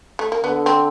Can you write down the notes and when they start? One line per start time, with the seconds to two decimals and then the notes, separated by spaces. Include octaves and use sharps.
0.19 A3
0.32 A#3
0.44 D3 B3
0.66 C4